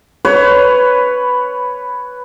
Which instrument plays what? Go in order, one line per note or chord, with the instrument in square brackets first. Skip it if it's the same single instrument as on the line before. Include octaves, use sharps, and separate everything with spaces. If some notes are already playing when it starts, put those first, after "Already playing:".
[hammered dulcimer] B4 C#5